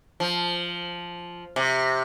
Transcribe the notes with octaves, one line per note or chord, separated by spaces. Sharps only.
F3
C3